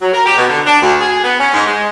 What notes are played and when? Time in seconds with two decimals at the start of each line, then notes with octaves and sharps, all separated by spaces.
0.02 F#3
0.14 A#4
0.26 G4
0.38 B2
0.49 D3
0.67 D4
0.82 D2
1.00 G#4
1.24 B3
1.40 C#4
1.54 G#2
1.67 G#3